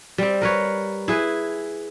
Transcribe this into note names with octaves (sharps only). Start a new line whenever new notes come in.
G3 C4
A#4 B4 C#5
E4 G#4 B4